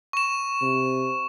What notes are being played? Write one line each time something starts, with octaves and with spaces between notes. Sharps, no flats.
C#6 E7
C3